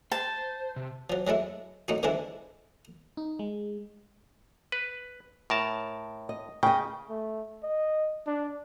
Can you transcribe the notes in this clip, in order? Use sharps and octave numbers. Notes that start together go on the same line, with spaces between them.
C5 A5
C3
F3 F#3
F#3 G#3 A3 E4
A2 D#4 F#4
D3 E3 F3 G#3 E4
D#4
G#3
B4
A2 A#4 A5
D#5
C#3 D#5 G5
A3
D#5
D4